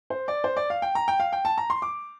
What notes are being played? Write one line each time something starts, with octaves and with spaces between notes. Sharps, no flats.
C5
D5
C5
D5
F5
G5
A#5
G5
F5
G5
A5
A#5
C6
D6